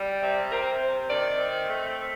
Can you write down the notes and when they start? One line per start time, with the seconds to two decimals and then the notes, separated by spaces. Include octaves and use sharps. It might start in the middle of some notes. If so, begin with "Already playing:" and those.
Already playing: G3
0.23 C3
0.52 C4 A#4
0.81 C3 C5
1.10 D#3 D5
1.39 C4
1.68 A3